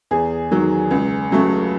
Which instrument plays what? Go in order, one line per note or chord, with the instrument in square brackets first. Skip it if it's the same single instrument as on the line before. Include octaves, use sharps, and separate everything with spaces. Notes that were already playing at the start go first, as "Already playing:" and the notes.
[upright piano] E2 G#4
D#3 F#3
C#2
C#3 F#3 A3